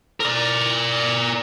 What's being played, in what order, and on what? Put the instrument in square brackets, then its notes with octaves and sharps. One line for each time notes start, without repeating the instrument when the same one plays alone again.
[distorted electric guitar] A#4 D5